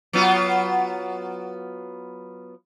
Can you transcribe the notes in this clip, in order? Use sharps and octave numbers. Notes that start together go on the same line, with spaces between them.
F#3 B3 F4